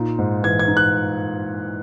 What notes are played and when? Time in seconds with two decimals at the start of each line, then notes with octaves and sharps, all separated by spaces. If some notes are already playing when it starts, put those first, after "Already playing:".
Already playing: A#2 D#4
0.19 G#2
0.43 E3 G#6
0.59 G#6
0.68 D#4
0.77 F#6